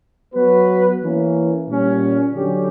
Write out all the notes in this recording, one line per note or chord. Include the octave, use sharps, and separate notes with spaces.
F#3 B3 F#4 B4
E3 A#3 C#4
A#2 G3 C#4
D3 F#3 C#4 G4